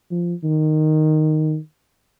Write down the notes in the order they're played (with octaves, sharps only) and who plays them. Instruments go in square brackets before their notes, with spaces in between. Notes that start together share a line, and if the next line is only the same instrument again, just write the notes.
[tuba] F3
D#3